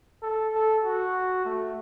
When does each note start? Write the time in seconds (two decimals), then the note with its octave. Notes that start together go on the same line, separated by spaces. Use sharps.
0.22 A4
0.55 A4
0.84 F#4
1.45 A3